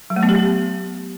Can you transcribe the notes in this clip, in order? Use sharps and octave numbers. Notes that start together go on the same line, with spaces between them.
F#3
A3
B3
G4
B3